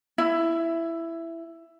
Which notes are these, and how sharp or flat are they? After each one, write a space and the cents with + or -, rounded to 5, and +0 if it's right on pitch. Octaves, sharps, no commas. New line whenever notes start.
E4 +10